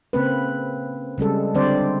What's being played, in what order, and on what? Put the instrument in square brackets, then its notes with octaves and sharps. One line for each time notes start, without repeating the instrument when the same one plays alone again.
[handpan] C#3 A#3 C4 B4
C#3 G3 G#3 A4
D3 G3 C4 C5 D5